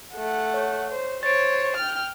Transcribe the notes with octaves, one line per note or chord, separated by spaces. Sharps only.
A3 F#5
C#5
C5
C5 C#5 A6 D7
G5 F6